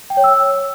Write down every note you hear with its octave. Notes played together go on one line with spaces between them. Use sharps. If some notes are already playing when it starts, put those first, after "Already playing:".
G5
C#5
E6